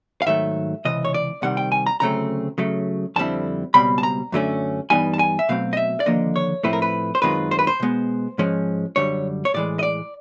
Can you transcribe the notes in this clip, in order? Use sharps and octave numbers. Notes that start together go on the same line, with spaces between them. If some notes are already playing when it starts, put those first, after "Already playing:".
F5
G#2 D#3 F#3 A3 E5
C#2 C3 E3 D#5
C#5
D5
C2 C3 D#3 G3 F#5
G5
G#5
A#5
D2 C#3 F#3 A3 C4 A#5
C#3 F#3 A3
F2 D3 G3 C4 E4 A5
C#2 B2 G3 C4 B5
A5
A#5
F#2 D3 F#3 A3 C#4
G2 E3 G3 B3 D#4 G#5
A5
G#5
E5
B2 F#3 A3 C4 F5
D#5
E5
D5
D#2 D3 F3 A#3 D#5
C#5
A2 F3 A3 C4 E4 B4
A#4
B4
C5
F#2 D#3 G#3 C4 F4 B4
C5
B4
C5
B2 G#3 B3
G#2 F3 G#3 C#4
F#2 D3 G3 C#5
C#5
A2 E3 G#3 D5
D#5
D5